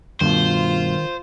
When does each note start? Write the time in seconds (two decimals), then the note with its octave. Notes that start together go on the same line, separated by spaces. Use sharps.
0.21 G2 B2 D#3 F4 C5